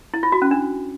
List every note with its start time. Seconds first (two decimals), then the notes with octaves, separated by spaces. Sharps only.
0.14 E4
0.23 F4
0.32 F#4
0.42 C#4
0.51 D4